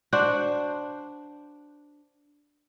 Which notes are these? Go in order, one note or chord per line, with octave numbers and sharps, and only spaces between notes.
D4 F#4 C5